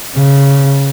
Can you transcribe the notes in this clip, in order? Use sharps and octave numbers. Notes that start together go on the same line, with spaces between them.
C#3